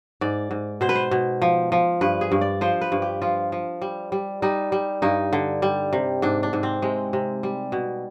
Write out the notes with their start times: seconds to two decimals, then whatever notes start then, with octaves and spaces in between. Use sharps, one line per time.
0.21 G#2 D5
0.51 G#2
0.81 B2 C5
0.89 B4
0.95 C5
1.11 B2
1.42 F3
1.72 F3
2.01 G2 B4
2.21 G#4
2.32 G2
2.41 D5
2.61 F3 C5
2.81 B4
2.92 G2
3.02 G4
3.22 F3 F4
3.52 F3
3.82 G3
4.12 G3
4.42 G3 D#4
4.72 G3
5.02 G2 D#4
5.33 D3
5.62 G3
5.93 C3
6.22 G#2 D4
6.43 D4
6.53 G#2
6.63 C4
6.82 C3 G#3
7.13 C3
7.43 G3
7.72 B2